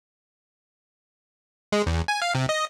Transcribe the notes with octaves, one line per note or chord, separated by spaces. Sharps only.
G#3
E2
G#5
F5
C3
D#5